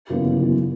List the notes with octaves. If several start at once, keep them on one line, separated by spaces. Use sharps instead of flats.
F#2 C#3 E3 B3
G1
F#2 C#3 E3 B3